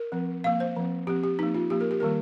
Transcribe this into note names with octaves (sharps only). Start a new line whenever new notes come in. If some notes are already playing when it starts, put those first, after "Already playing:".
Already playing: A#4
F3 C4
F3 A#3 F5
C5
F3 C4
F3 C4 G4
G4
F3 A#3 D#4
F4
F3 A#3 G4
A#4
G4
D#3 G3 A#3 A#4